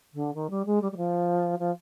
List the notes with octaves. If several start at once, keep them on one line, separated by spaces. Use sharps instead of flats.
D3
D#3
G3
G#3
G3
G3
F3
F3